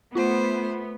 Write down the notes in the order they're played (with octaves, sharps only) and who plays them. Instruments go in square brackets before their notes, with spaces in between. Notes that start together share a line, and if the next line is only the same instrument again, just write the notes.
[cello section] A3 B3 [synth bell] F4 F#5 [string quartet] C5